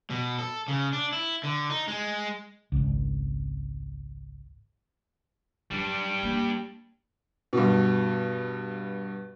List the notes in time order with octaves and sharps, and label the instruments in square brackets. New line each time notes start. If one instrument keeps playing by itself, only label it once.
[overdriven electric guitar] B2
A4
C#3
D4
E4
D3
D#4
G#3
[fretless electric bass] G#1 C#2
[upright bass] F#3 [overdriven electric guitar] G3 D4
[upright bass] A#3
[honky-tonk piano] G2 B2